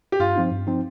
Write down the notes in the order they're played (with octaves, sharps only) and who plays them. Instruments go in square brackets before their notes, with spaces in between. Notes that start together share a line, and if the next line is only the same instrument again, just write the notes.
[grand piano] G4
[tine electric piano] G2 [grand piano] F4
[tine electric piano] F3 C4 D#4
G2
F3 C4 D#4